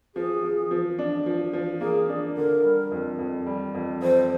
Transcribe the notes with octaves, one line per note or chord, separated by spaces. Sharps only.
F3 G#4
F3
F3
D4
F3
F3
A#3 G#4
D4
D3 A#4
G3
F2
F2
G3
F2
F2 C5